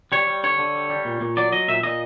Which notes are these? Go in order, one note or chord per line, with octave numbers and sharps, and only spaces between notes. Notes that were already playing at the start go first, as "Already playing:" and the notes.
G3 C#5
G3
D3 C#5
D3
G3
G3
A#2
A#2
F#3 D5
F#3 D#5
A#2 E5
A#2 D#5